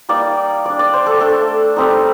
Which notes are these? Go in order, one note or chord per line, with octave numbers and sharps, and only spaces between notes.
G3 A#3 D#4 D5
G3 D4 D5
D5
C5
A4
A3 D4 A4
G3 C4 D#4